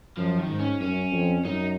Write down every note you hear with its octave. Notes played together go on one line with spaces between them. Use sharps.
F#2 F3
D#3
G#2
C#4
F#2 C#4
F2
F#2 D#4